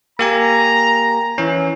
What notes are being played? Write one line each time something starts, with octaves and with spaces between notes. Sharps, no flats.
A#3 G4 G#5 A#5
E3 C#4